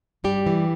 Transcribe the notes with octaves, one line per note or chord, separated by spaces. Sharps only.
G2 G3 G4
E3